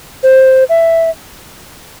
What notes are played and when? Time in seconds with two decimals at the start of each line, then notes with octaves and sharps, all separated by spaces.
0.23 C5
0.69 E5